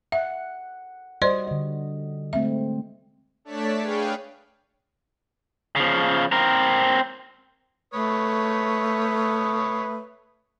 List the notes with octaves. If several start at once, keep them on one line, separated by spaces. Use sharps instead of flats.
E5 F#5
G3 F#4 C5 D5 D#5 C6
D3 D#5
G#3 A3 C4 E5
A3 D4 C#5 D5 A5 B6
G#4 B4 C#5 F5 G5
C#3 F3
C4 A#4
A3 B4 C#5 D#6